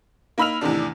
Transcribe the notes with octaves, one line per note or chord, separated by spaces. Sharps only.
A#3 D#4 B5 E6 F6 F7
E2 A2 C3 D#3 D4